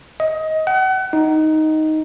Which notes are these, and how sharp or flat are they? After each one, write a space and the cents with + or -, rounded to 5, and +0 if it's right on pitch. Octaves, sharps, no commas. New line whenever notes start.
D#5 +20
F#5 +35
D#4 +5